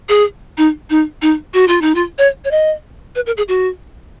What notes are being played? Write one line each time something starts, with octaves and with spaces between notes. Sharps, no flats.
G#4
D#4
D#4
D#4
F#4
F4
D#4
F4
C#5
C#5
D#5
B4
A#4
G#4
F#4